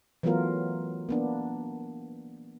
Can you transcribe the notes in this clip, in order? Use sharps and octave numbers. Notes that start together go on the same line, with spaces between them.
E3 F#3 A3 B3 F4 A#4
A#3 B3 D4